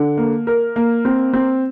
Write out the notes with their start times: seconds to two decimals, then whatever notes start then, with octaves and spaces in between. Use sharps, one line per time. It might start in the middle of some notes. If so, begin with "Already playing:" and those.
Already playing: D3
0.17 A#3
0.47 A#4
0.76 A#3
1.05 C4
1.33 C4